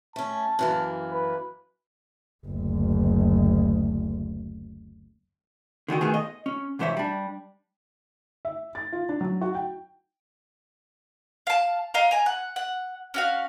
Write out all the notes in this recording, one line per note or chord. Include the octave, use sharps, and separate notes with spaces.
A3 C#4 A5
F#2 E3 A#3
B4
F#1 D2
D3 D#3 F#4 G4
D#3 A3 B3 F4 G#4
D#5
C#4
C2 G#2 E3 C5 C#5 E5
G3 D4
E5
A6
F4
D4
F#3
F#4
G5
F5 A5
D#5 F5 A#5
G#5 A#5
F#5
F#5
C#4 F#4 F5